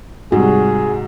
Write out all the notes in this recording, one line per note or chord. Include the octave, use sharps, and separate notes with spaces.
G#2 C3 G3 F#4 G#4